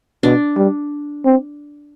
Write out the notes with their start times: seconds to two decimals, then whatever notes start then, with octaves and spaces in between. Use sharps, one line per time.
0.23 B2 D4
0.57 G3
1.25 C4